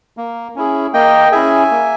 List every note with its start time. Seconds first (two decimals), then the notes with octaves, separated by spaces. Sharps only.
0.17 A#3
0.56 C#4 E4 G#4
0.93 A#3 D#5 G5
1.32 C#4 E4 G#4 E5 G#5
1.71 A#3